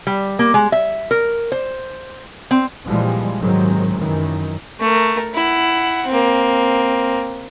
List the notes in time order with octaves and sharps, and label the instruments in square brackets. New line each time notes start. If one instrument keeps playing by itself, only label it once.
[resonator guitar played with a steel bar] G3
A#3
G#3
E5
A#4
C5
C4
[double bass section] A#2 E3 F3 G3 G#3
G#2 C3 D#3 F#3 G#3
F#2 D#3 E3
[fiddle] A3 A#4
E4 F#5
A#3 C4